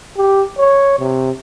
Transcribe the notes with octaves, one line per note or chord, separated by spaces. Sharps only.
G4
C#5
C3